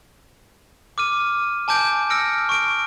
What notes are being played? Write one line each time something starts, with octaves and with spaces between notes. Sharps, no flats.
D6 F6 D#7
G#5 A5 D6 G6 D7
E6 F6 A#6 C#7 D7
C#6 D7